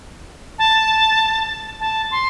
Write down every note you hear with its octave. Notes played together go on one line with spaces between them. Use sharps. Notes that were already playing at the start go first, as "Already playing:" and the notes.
A5
A5
C6